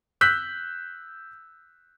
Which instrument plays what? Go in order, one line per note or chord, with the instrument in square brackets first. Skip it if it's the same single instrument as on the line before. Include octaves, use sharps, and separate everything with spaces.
[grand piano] E6 F#6 G6 B6